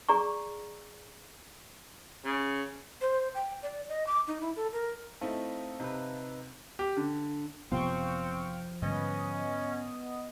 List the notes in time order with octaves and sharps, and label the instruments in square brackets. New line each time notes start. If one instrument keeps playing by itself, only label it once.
[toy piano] G#4 D5 A#5 C#6
[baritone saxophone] C#3
[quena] C5
G5
D5
D#5
D6
D#4
E4
A4
A#4
[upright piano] A3 D#4 E4 [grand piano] C4 [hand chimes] F5 A5
[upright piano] C3 [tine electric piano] D#4 B4
[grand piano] G4
D3
[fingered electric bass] F#1 C3 B3 [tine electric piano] F3 [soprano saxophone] C4 [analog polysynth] F5 G5 C#6
[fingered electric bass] G#2 D3 G3 [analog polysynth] B3 D#5 [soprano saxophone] C#4